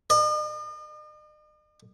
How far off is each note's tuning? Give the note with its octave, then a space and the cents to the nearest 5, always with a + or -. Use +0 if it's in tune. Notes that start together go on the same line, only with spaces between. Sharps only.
D#5 -45